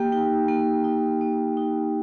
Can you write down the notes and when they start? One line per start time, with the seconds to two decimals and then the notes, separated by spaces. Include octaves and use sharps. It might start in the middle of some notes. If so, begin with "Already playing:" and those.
Already playing: A#3 G4 G5
0.12 D#4
0.49 A#3
0.84 D#4
1.21 A#3
1.57 D#4